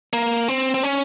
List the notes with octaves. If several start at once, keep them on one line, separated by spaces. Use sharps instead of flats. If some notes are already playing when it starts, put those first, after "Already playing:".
A#3
C4
C4
C#4